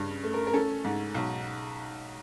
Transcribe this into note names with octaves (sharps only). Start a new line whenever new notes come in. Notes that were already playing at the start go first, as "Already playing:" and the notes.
Already playing: G2 C#3
A3
A#4
A#4
C#4 A4
G#2
B1